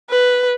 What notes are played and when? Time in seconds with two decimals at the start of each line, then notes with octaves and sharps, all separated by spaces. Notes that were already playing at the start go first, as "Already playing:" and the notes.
0.10 B4